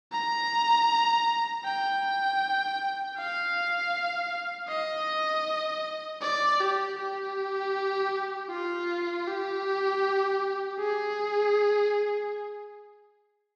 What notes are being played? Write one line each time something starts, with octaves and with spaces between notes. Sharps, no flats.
A#5
G5
F5
D#5
D5
G4
G4
F4
G4
G#4